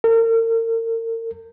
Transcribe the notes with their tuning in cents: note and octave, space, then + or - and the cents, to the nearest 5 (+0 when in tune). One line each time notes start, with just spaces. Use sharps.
A#4 -40